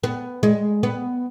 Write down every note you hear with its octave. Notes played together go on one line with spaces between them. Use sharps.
B3
G#3
B3